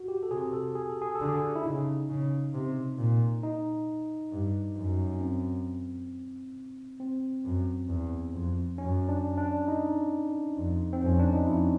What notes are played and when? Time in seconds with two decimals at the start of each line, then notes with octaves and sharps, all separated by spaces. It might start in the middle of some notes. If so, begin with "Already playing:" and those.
Already playing: F#4
0.08 G4
0.23 A4
0.30 C3 G#4
0.53 A4
0.75 G#4
0.89 A4
1.02 G#4
1.15 A4
1.21 D3
1.29 G#4
1.55 E4
1.64 C#3 D#4
2.09 C#3
2.54 C3
2.98 A#2
3.43 D#4
4.32 G2
4.77 F#2
5.15 C#4
5.21 C4
7.00 C4
7.45 F#2
7.89 E2
8.33 F2
8.78 F#2 C#4
9.09 D4
9.38 D4
9.68 D#4
10.56 F2
10.93 C4
11.02 F2 C#4
11.19 D4
11.33 D#4
11.46 F2 E4